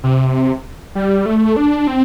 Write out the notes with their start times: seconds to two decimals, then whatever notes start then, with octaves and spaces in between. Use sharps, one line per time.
0.04 C3
0.95 G3
1.26 A3
1.56 D4
1.87 C4